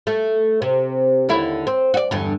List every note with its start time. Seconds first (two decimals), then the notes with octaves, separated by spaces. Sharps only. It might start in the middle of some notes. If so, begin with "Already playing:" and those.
0.07 A3
0.62 C3
1.29 D#2 D3 E4
1.67 C4
1.94 F#4 D5
2.11 E2 G2 D3